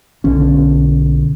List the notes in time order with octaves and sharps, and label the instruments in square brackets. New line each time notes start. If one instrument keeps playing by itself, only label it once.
[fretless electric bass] B1 D3 C#4